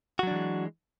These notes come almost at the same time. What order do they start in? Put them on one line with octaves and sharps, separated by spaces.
F#4 F#3 D4 E3 G#3